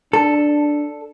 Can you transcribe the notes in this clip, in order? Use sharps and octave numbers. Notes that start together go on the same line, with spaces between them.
D4 A4